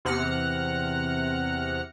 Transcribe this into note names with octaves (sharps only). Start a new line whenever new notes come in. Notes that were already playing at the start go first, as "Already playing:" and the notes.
E2 C3 F#5 F6 A#6 C#7